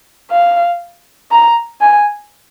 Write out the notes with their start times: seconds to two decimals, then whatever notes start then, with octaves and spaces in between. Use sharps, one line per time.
0.31 F5
1.32 A#5
1.81 G#5